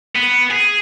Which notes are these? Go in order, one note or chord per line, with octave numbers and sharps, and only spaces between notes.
B3
G#4